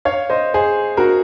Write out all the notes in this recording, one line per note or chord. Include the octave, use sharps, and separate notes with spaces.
C#5 F5
C5 D#5
G#4 C5
F#4 A#4